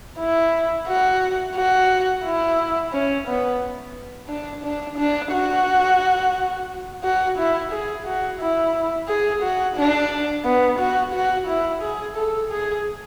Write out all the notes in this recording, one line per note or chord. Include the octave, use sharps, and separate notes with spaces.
E4
F#4
F#4
E4
C#4
B3
D4
D4
D4
F#4
F#4
E4
G#4
F#4
E4
G#4
F#4
D4
B3
F#4
F#4
E4
G#4
A4
G#4